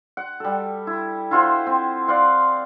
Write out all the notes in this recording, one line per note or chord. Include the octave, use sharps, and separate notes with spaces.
F#5
G3 A4
E4
E4 F4 C5 F#5
C4
D5 F5 F#5 C6